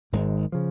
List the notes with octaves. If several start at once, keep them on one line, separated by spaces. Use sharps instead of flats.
G#1 G#2 D#3 G#3
C#3 F3